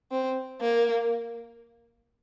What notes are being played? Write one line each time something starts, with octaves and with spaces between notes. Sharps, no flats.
C4
A#3